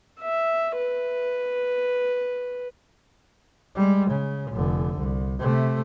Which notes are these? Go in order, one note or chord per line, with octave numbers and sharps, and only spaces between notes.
E5
B4
G3 G#3
C#3
F1 D3
C2
C3 A3